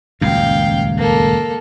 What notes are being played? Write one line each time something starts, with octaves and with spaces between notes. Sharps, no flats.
D#1 C#2 F#2 F5 G5
A#3 A4